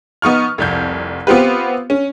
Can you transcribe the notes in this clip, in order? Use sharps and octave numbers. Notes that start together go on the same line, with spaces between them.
B3 D#4 C#6 F6
F1 C2 G6
B3 C4 F4 G4 B4
C#4